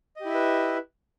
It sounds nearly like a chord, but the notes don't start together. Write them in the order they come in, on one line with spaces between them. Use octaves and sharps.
D#5 G4 E4 E5 B4